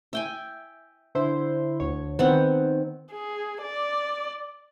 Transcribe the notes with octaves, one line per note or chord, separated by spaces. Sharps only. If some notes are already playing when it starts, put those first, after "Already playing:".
E5 G5 G#5
D3 E4 C5
D2 C#5
D#3 B3 C4 F#5
G#4
D5